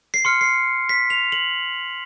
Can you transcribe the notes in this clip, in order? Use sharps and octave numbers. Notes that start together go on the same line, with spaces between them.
C7
C6 F6 C#7
C7
B6
F7
F#7